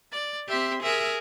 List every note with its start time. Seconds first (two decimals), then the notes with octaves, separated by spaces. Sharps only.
0.12 D5
0.48 C4 G4 E5 C6
0.83 G#4 A#4 E5